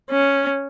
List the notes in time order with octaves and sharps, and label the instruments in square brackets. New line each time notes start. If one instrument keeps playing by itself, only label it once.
[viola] C#4